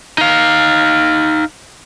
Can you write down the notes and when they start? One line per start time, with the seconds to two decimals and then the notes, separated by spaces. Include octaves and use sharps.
0.18 D#4 F5